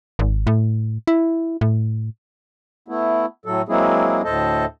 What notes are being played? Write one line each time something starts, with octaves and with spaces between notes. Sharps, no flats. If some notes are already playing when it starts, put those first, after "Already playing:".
G#1
A2
E4
A2
A3 B3 E4
A2 F#3 A4
F#3 G#3 A#3 C4 E4 G#4
D2 A2 A4 C5 D#5 A5